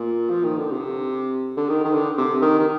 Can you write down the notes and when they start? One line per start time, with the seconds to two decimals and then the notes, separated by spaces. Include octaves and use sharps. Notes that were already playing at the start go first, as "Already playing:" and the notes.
Already playing: A#2
0.30 F3
0.44 D#3
0.57 D3
0.72 C3
1.57 D3
1.69 D#3
1.84 D#3
1.93 D3
2.17 C3
2.42 D#3
2.59 D#3